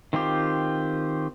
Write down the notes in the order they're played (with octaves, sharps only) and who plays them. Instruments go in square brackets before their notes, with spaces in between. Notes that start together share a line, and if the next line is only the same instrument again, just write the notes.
[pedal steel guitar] D#3 C4 F4 G4